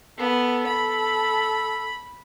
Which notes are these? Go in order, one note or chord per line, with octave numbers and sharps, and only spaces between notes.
B3 A4
B5